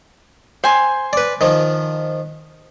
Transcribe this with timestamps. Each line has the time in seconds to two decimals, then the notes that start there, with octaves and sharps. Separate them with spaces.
0.64 C5 G#5 C6
1.13 B4 D5
1.41 D#3 F3